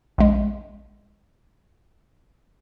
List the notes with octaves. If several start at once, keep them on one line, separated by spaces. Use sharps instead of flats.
A#1 G#3